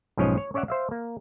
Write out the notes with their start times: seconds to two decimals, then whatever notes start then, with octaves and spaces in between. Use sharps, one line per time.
0.17 B1 G#2 F3 C#4 C#5 D#5
0.37 C#5
0.54 C#4 C#5 D5 E5 F#5
0.68 C5 E5 F5
0.91 A#3